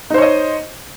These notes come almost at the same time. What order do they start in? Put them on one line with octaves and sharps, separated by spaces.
D#4 C5 C#5 D#5